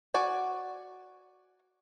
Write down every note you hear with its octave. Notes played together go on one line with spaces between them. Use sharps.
F#4 D5 G#5